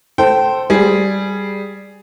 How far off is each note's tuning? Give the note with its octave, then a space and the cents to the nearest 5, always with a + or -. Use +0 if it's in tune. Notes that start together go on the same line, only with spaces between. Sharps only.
A4 +0 C5 +0 G5 -25
G3 +0 G#4 +0